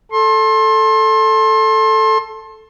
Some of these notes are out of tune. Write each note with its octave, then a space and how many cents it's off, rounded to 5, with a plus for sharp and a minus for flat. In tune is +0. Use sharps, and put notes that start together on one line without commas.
A4 +0 C6 +30